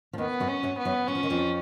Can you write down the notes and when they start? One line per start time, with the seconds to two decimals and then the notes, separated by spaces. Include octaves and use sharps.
0.13 F3
0.18 D#2 D#3 B3
0.40 F#2 F#3
0.48 C#4
0.63 F#2 F#3
0.78 B3
0.85 F#2 F#3
1.08 F#3 C#4
1.15 F3
1.23 D#3
1.30 F2 F3